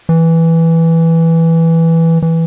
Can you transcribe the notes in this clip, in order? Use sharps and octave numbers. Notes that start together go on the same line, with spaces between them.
E3
E3